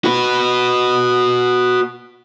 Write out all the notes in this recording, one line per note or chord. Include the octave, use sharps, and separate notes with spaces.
F#4 B4